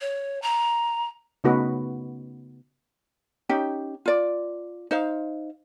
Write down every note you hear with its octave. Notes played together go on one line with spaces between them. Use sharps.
C#5
A#5
C#3 A3 B3 D#4 F#4 B4
C#4 D#4 G4
F4 D5
D#4 C5 F5